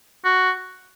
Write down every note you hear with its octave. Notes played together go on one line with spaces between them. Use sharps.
F#4